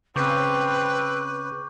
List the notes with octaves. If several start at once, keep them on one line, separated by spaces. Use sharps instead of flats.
C#3 C4 B4 C#6 D6 G6